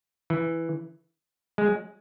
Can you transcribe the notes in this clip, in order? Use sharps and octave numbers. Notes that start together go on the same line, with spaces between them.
E3
G#3